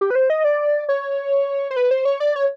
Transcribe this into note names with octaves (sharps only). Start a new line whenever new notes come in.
G4
B4
C5
D#5
D5
C#5
C5
B4
C5
C#5
D5
C#5